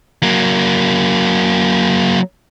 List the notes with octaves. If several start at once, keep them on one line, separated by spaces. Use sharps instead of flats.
F#3 A#3